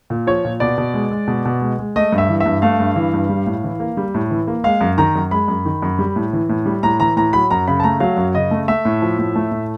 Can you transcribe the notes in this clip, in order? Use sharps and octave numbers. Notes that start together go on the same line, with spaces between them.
A#2
F3 C#5
A#2
B2 D5
B2
G#3
G#3
B2
B2
G#3
G#3
A3 D#5
G2
E5
E3
E5
G2
A3 F5
G2
E3
G2
G3
A2
E3
A#3
G3
A2
E3
A#3
G#3 F5
F#2
D#3 A#5
F#2
G#3 B5
F#2
D#3
F#2
G3
A2
E3
A2
G3
A2 A#5
E3 A#5
A2 A#5
F#3 B5
F#2 A#5
C#3 B5
A5
A3 A#5
F#3 F5
F#2
C#3 D#5
A3
A3 E5
A2
F3
A2
A3
A2